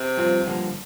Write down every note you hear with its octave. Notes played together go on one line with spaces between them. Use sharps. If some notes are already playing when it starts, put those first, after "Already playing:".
Already playing: C3
G2 F3 C4 F4
G2 D3 F3 A#3